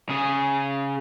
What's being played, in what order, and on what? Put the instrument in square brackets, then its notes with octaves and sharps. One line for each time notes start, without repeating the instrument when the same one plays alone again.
[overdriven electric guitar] C#3 G#4